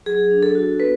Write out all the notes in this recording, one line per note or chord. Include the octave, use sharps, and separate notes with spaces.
F#3 G#4
D4
A4
F#4
B3 B4